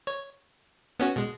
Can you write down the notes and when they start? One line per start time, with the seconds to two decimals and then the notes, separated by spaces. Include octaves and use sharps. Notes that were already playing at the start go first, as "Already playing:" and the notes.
0.07 C#5
1.00 B3 C#4 F#4
1.16 B2 G#3